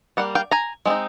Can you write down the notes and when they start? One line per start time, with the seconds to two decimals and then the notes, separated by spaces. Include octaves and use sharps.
0.17 G3 A#3 F#5
0.35 F5 G5
0.51 G#5 A#5
0.86 G#3 C4 D#4